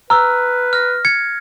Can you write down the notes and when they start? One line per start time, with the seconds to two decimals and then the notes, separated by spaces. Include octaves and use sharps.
0.10 B4 A#5 E6 F6
0.73 F6 A#6
1.05 G#6 C#7